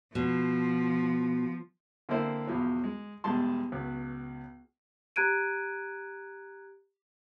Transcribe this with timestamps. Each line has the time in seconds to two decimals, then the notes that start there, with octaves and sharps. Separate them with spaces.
0.15 B2 F3
2.09 D3 A#3 C4 D4 E4 C5
2.47 B1 E2 F3 F#3
2.84 G#3
3.24 B1 E2 G3 G#3 A5 C6
3.72 C#2 F#3 B3
5.16 G4 A#5 F#6 G#6 D7 D#7